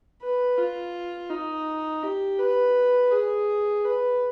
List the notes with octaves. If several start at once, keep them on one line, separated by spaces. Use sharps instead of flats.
B4
F4
D#4
G4
B4
G#4
B4